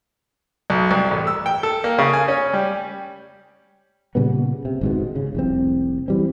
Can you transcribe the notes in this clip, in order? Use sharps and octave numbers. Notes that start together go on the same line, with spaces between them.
B1
C2
A1
E6
G5
A4
A#3
C#3
G#5
C#4
G3
A#2 C#3 G3 B3
C3
G#1 G#2 B2
C#3
F1 C2 C4
E3 G3 C4